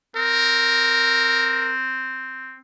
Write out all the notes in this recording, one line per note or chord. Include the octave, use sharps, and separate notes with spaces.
C4 A#4